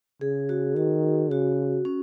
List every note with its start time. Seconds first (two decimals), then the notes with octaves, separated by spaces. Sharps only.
0.21 C#3 G#4
0.49 F#4
0.76 D#3 F#4
1.31 C#3 F#4
1.85 C#4